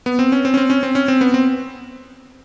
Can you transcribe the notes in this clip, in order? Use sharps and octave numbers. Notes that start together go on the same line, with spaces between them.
B3
C4
C#4
C4
C#4
C4
C#4
C4
C#4
C4
B3
C4